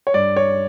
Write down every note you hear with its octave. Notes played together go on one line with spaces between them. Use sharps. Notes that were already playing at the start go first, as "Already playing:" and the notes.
C#5
G2 D5
C#5